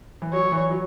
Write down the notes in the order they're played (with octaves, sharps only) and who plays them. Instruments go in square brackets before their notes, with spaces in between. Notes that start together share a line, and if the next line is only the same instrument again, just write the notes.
[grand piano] E3
[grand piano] F#3 [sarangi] C#5
[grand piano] E3
F#3